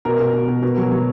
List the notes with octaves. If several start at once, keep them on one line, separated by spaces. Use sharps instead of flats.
B2 A#4
B2
B2
B2
B2
F#3
F#3